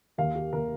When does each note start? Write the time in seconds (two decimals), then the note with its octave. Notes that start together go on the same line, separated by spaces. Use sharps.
0.18 D#2 D#3 A#3 F5
0.35 G4
0.53 D#3 A#3 A#4